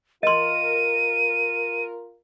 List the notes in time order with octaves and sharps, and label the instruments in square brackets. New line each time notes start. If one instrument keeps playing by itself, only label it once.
[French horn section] F4 A#4 [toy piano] D#5 C6 [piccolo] D#7